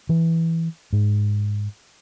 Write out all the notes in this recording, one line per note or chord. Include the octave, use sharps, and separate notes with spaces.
E3
G#2